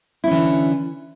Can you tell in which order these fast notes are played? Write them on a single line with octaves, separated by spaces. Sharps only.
E4 C#4 E3 D3